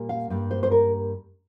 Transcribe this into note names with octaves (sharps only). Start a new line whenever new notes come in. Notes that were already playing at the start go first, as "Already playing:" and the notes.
Already playing: A#2 G3 A#3
F5
G2 G3 A#3
C5
C5
A#4